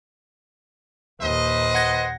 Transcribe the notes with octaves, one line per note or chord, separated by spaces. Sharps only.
D#2 A#2 B4 C5 D#5
F#5 G#6 A#6